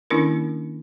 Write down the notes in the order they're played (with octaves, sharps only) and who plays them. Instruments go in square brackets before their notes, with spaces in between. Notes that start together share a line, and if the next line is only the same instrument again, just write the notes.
[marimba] D#3 A#3 C#4 D4 E4 A#4